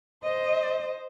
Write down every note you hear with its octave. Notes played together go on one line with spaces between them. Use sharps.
C5 D#5